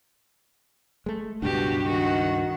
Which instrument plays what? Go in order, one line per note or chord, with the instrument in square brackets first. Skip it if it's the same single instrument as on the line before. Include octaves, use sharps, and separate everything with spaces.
[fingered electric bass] G#3 A3
[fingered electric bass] C#2 G2 [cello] B2 [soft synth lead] D4 [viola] F#4 G4
[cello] D#3 F#5 [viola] F#4